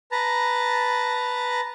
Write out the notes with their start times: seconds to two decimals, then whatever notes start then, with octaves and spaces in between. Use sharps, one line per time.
0.12 B4 A5 A#5